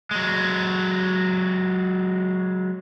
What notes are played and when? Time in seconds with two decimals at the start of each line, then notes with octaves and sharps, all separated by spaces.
0.11 F#3 G#3